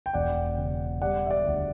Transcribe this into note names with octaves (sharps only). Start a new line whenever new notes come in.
G5
E1 D5 F#5
C#3
G3 D5 F#5
E5
D5 F#5
D2